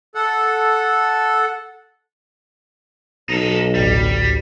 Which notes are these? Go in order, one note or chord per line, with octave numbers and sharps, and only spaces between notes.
A4 F#5
B1 D#4 A4
A1 D2 G3